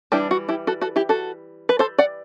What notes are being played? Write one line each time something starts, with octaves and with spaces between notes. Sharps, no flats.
E3 G3 D4 E4 G4
F#4
E4 G4
F#4 A4
F#4 A4
E4 G4
F#4 A4
B4
A4 C5
D5 F#5